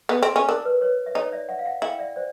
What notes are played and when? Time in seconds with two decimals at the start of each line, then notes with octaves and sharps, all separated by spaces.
0.09 B3
0.23 C4
0.36 C#4
0.49 D4 A#4
0.65 B4
0.81 B4 C#5
1.06 E5
1.15 D#4 C#5 D#5
1.32 D5 E5
1.49 E5 F#5
1.59 F5
1.66 E5 F#5
1.82 E4 F5 G5
1.99 D5 E5
2.16 C5 D5